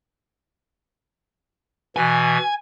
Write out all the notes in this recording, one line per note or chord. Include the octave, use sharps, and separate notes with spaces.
B2 E3 G#5